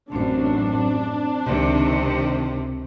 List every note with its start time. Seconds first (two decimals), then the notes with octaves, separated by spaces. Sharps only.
0.12 A1 F#2 C4 D4 C5
1.47 C#2 C3 D#3